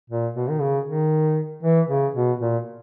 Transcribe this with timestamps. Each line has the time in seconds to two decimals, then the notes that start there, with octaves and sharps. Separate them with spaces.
0.10 A#2
0.35 B2
0.50 D#3
0.61 C#3
0.86 D#3
1.63 E3
1.89 C#3
2.15 B2
2.40 A#2